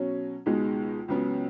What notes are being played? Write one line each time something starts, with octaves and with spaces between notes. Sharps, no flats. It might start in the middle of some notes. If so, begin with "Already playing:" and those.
Already playing: B2 F#3 C#4
C#2 B2 G#3 D#4
C#2 C#3 F#3 B3